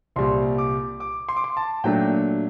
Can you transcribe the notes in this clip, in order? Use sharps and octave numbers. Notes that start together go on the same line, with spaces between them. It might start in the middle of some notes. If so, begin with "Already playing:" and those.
C2 A#2 G3 C6
D6
D6
C6
D6
C6
A5
A#2 F#3 A3 D4 G5